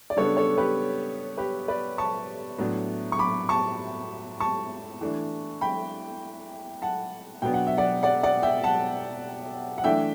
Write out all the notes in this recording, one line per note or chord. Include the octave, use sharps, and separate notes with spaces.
D5
C#3 G3 B3 D4 A4 C#5
A4 C#5
G4 B4
G4 B4
B4 D5
A5 C#6
A2 F#3 B3 D4
C#6
B5 D6
A5 C#6
A5 C#6
E3 A3 D4
G5 B5
F#5 A5
B2 F#3 B3 D4 G5
F#5
E5
D5 F#5
D5 F#5
D5 F#5
E5 G5
F#5 A5
F#5
E3 A3 D4 E5 G5